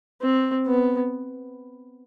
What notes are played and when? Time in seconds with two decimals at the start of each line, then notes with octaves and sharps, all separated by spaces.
0.22 C4
0.67 B3